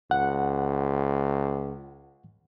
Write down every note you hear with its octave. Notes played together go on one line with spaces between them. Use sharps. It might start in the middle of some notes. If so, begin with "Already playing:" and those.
C#2 F#5